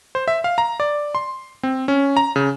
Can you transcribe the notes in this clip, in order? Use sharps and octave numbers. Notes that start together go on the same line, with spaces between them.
C5
E5
F5
A#5
D5
C6
C4
C#4
A#5
C#3